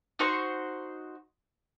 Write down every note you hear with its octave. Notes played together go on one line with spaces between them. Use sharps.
D#4 F#4 C5 C#6